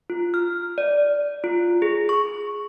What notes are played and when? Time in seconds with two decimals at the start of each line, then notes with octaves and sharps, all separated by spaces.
0.10 F4
0.34 F6
0.78 D5
1.44 F4
1.82 G#4
2.09 C#6